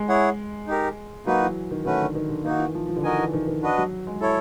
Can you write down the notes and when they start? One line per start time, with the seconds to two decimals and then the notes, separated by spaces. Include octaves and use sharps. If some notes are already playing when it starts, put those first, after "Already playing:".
Already playing: G#3
0.08 E4 G#4 C#5 F#5
0.67 D#4 G4 A#4
1.26 F#3 A#3 D#4 F#4 B4
1.42 E3
1.71 D#3
1.85 D#3 A3 C#4 F#4 B4
2.01 D3
2.15 D#3
2.29 D3
2.44 D#3 A#3 D#4 F#4
2.59 E3
2.75 F3
2.88 F3
2.96 D3
3.03 D#3 F#4 A#4 D#5 G#5
3.18 E3
3.33 D#3
3.47 D#3
3.62 D4 F#4 B4 D#5
3.78 F#3
4.07 G#3
4.21 E4 A4 C#5